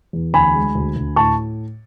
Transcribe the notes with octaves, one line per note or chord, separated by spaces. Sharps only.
E2
D2 G#5 B5
G#3
D2
D2
A2 A5 C#6